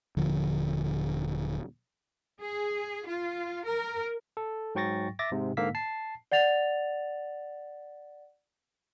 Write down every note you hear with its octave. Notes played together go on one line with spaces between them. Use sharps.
D#1 D3 F3
G#4
F4
A#4
A4
G#2 F#3 G5 C#6 A6 A#6
E5 D6 A6 A#6
G#2 C3
G#2 D3 A#3 F5 E6 B6
A5 C7
D5 F#5 A6 F7